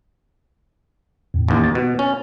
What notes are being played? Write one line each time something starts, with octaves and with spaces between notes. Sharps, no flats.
E2 A2
A1 D#2
A6
B2
C#4